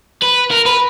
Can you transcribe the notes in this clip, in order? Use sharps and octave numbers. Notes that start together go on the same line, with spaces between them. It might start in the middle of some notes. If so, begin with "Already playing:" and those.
B4
A#4
B4